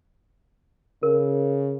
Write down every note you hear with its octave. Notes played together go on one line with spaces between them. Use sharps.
C#3 A#4